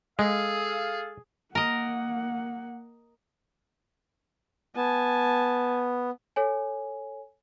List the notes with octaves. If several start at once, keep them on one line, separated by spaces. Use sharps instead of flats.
G#3 G#4 A4 F5
A#3 A#4 D#5 F#5
B3 G#5 A5
A4 C#5 G#5